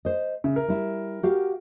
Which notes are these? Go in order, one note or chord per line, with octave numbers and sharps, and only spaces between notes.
C5 D#5
C#3 E5
A#4
G3 E4
F#4 G4 F5